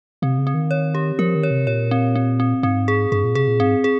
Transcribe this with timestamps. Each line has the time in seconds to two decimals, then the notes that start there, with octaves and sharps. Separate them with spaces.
0.22 C3 C4
0.38 C#3
0.47 C4
0.54 D#3
0.71 C#5
0.95 G4
1.19 F3 A#4
1.35 D#3
1.43 C#5
1.51 C3
1.67 A#2 C#5
1.91 C4
2.16 C4
2.40 C4
2.63 G#2 C4
2.88 G#4
3.12 G2 G#4
3.24 A#2
3.35 C3 G#4
3.48 A#2
3.60 G#2 C4
3.84 G#4